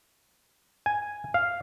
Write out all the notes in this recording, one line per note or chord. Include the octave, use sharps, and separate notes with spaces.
G#5
F5